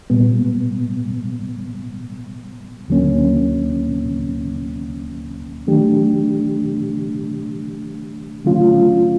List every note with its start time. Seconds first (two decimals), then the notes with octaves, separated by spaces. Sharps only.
0.10 A#2 G3 B3
2.88 D2 D3 F#3 A#3 C#4
5.67 D#3 F#3 A3 D4 G4
8.45 D3 F#3 A3 C#4 F4